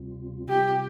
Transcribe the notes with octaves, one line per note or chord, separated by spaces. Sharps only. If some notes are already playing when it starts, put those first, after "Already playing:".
Already playing: D2 C3 G3 C4 F4
C3 G3 C4 F4 G4